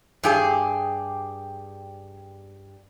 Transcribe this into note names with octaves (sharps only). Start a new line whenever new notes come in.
G2 G4 G#4